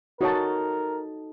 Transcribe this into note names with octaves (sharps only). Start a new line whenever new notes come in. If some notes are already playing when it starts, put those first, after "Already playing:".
D#4 F#4 A4 A#4 C#5 A5